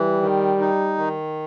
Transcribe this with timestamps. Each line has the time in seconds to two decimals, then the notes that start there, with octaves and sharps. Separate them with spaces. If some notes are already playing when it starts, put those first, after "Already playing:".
Already playing: E3 G3
0.22 D#3
0.60 D#4
0.98 D#3